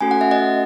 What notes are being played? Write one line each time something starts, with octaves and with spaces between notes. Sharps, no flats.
A3 C#4 F#4 A4 G#5
F#5
E5
D#5 F#5